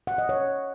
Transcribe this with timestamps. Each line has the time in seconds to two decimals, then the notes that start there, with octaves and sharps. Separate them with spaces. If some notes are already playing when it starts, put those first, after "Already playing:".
0.07 F#5
0.18 D#5
0.29 C#5